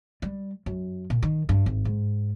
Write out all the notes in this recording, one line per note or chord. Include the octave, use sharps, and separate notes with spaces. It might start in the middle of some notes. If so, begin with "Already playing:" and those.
G3
F#2
A#2
D#3
G2
G#1
G#2